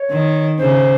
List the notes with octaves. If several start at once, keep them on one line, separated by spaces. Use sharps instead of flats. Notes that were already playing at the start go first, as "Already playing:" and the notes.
Already playing: C#5
D#3
C#3 C5